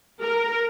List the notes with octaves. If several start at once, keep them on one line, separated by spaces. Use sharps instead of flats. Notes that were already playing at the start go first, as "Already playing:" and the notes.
A#4